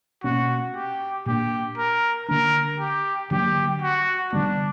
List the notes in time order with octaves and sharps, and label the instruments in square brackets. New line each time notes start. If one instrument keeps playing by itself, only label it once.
[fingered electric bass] B2 A#3 C#4 [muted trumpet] F#4
[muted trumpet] G4
[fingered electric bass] A#2 A#3 D4 [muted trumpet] G4
[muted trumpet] A#4
[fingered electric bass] D3 A#3 D4 [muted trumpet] A#4
[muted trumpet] G4
[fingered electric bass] D3 F#3 A#3 [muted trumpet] G4
[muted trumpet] F#4
[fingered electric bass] D3 G3 B3 [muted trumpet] D4